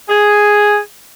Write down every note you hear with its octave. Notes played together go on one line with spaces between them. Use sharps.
G#4